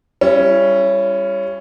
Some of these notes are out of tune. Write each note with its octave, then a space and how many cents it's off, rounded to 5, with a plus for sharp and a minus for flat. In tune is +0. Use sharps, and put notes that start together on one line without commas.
G3 +10 C#4 +0 E4 +40